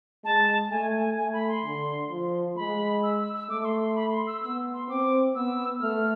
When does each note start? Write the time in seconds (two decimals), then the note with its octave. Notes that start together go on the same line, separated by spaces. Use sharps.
0.24 G#3 A5
0.71 A3 G#5
0.94 G#5
1.17 A3 G#5
1.33 B5
1.48 C6
1.64 D3
2.10 F3
2.56 G#3 B5
3.03 E6
3.19 E6
3.33 E6
3.49 A3 D6
3.61 D6
3.65 C6
3.80 C6
3.95 B5
4.11 C6
4.27 E6
4.42 B3 E6
4.74 C6
4.89 C4 D6
5.35 B3 E6
5.81 A3 F6